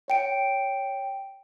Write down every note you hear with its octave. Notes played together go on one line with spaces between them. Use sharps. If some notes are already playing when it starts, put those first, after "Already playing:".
C#5 G5 D7